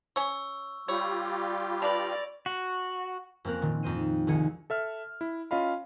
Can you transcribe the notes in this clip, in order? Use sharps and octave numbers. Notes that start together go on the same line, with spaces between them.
C#4 C#5 C#6 E6
G3 F4 G4 C#5 B5 E6 G#6
D4 B4 D5 B5 A#6 F7
F#4
F2 A#3 C4 C#4 A#4 F#6
A#2 D#3
F2 D#4 C5 D#7
C2 D#3 G#4 C#7
A4 E5 F6
E4
C#4 F4 D#5 F5 B5